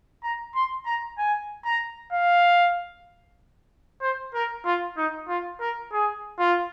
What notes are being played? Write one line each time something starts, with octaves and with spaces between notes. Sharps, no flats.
A#5
C6
A#5
G#5
A#5
F5
C5
A#4
F4
D#4
F4
A#4
G#4
F4